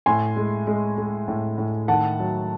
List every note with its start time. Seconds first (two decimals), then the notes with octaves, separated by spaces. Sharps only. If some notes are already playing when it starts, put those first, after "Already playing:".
0.06 A2 G#5 C6
0.36 G#3
0.67 G#3
0.98 G#3
1.28 A2
1.58 A2
1.88 D#3 F#5 A5
2.19 F#3